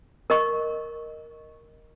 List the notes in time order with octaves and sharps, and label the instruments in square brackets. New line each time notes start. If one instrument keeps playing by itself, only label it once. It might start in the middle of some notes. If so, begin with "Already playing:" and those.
[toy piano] A#4 D#5 C#6